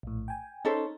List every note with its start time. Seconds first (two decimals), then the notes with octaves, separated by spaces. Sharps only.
0.03 A#1 A2
0.28 G5 G#5
0.65 C#4 D#4 A4 C5